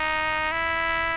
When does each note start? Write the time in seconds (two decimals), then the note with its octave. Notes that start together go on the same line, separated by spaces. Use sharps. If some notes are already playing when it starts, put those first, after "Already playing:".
Already playing: D#4
0.52 E4